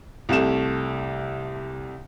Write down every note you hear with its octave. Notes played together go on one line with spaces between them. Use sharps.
C2 C3 A3 E7